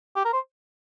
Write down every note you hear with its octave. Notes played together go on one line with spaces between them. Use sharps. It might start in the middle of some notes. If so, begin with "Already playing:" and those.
G4
A#4
C5